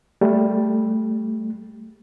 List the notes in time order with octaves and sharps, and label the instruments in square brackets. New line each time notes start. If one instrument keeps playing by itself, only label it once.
[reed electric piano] G3 A3